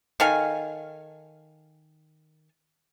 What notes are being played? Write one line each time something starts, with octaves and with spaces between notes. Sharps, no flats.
D#3 A4 F5 G#5